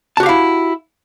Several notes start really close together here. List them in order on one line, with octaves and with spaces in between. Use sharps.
A5 F#4 G4 F5 E4